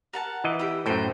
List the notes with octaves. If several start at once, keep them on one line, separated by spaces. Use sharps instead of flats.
A#4 F#5 A5
E3 D#5
E4 G4
F#2 A2 C5 G5